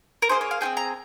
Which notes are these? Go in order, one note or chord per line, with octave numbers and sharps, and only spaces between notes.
A#4
A#3 D#4 G#4 C5
C#5
F5
C4 F4 G#4 G5
A#5